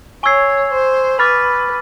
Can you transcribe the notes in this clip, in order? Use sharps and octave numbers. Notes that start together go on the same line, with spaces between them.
C#5 G#5 C#6 E6 G#6 C7
C5
B4 B5 D6 F6 A6